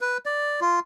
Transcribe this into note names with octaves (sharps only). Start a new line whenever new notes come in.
B4
D5
F4